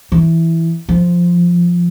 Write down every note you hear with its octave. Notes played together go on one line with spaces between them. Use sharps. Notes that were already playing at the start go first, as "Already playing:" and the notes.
E3
F3